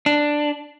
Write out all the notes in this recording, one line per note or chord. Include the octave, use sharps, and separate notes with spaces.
D4